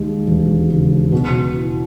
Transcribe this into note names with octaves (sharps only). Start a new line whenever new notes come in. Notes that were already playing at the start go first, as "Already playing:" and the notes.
Already playing: D#2 G#3
E1
C#3
B2
E4